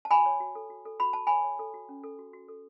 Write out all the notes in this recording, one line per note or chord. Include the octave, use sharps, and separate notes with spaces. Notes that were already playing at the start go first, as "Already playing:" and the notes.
A5
F#4 G#5 B5
C#5
F#4
A4
F#4
A4
F#4 B5
F#4 A5
C#5 G#5 B5
C#5
A4
F#4
C#4
A4
F#4
F#4
A4